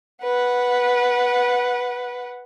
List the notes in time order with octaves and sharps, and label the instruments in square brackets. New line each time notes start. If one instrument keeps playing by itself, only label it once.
[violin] B4 F#5